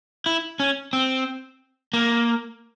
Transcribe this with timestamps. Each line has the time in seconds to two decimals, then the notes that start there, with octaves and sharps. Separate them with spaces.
0.26 E4
0.60 C#4
0.93 C4
1.93 A#3